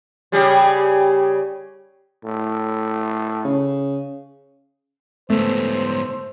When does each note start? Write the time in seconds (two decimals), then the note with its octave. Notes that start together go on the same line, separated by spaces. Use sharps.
0.32 C#3 G3 G#4
2.25 A2
3.45 C#3
5.30 G#2 A3 B3 C5